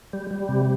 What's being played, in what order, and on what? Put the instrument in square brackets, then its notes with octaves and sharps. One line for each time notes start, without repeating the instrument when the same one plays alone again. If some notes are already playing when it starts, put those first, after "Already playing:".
[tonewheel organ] G3
G3
C3